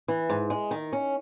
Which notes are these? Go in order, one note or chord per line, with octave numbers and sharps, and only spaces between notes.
E3
G#2
G#3
D#3
C#4